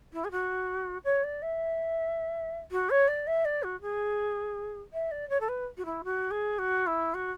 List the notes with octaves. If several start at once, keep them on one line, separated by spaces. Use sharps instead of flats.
E4
G#4
F#4
C#5
D5
E5
F#4
C#5
D5
E5
D5
F#4
G#4
E5
D5
C#5
A4
B4
F#4
E4
F#4
G#4
F#4
E4
F#4